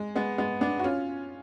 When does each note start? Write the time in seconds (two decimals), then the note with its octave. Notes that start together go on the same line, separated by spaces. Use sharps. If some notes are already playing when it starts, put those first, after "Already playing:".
Already playing: G#3
0.15 G#3 B3
0.38 G#3 B3
0.61 B3 D4
0.79 F#4
0.84 C#4 F4